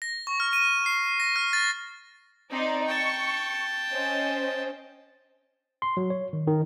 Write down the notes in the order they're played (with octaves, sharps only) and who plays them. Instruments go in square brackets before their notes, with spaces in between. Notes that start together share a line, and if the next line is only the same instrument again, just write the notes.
[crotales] A#6
C#6
F6
D#7
C7
A#6
F6
A6
[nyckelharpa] C4 [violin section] D#4 D5
[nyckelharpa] G5 A5 [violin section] C#6
[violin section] C#4 C5 D#5
[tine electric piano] C6
F#3
C#5
D#3
D#3